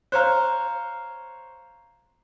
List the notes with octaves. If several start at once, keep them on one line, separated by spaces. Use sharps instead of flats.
C5 C#5 F5 A#5 F#6